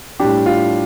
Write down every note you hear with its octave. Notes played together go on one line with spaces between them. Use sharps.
A2 G3 D4 G4
F4